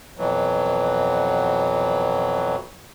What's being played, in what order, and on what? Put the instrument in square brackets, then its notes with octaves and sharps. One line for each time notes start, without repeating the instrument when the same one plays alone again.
[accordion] F2 B2 E3 F#3